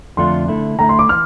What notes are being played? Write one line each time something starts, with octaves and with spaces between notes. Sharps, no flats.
F2 D3 A3 D4 F4 C6
D3 A3 E4
D3 A3 E4 A#5
C6
D6
E3 F6